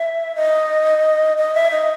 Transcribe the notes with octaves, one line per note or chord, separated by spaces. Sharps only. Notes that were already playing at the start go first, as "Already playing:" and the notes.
Already playing: E5
D#5
D#5
E5
D#5